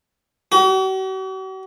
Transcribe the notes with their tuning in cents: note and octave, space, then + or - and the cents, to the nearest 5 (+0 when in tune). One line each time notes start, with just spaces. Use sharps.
F#4 +45